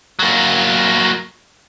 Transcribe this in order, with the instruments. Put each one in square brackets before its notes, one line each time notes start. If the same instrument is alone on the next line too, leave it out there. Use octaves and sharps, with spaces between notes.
[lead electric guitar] F#3 A#3